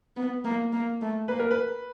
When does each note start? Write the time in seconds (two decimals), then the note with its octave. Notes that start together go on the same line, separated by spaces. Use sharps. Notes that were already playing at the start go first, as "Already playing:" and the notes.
0.16 B3
0.45 A#3
0.73 A#3
1.01 A3
1.28 A#3 B4
1.39 A#4
1.51 B4